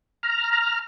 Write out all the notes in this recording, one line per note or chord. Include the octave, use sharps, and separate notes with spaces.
A#5 F6